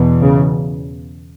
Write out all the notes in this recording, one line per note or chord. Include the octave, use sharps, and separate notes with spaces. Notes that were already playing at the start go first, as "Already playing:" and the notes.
Already playing: E2 B2
C#3